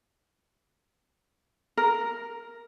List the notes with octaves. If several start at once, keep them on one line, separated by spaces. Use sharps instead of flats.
A#4